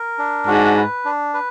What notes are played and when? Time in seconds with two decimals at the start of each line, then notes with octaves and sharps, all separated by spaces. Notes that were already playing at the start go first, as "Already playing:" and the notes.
Already playing: A#4
0.18 D4
0.47 G#2 F#4
0.77 B4
1.05 D4
1.34 B4